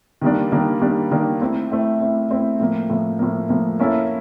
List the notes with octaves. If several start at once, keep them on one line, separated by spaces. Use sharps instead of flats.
D#3 G3 A#3 D4
D#3 G3 A#3 D4
D#3 G3 A#3 D4
D#3 G3 A#3 D4
A3 C4 E4
A3 C4 E4
A3 C4 E4
A3 C4 E4
A2 F3 A#3
A2 F3 A#3
A2 F3 A#3
A2 F3 A#3
A#3 C#4 E4 A4